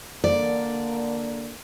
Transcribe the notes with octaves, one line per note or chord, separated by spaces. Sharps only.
D3 A#3 D5